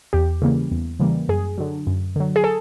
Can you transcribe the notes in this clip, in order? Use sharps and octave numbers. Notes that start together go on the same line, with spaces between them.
E2 G4
C#3 E3 G3 A#3
E2
C#3 E3 G3 A#3
F#2 G#4
D3 F#3
F#2
D3 F#3
G#4
A4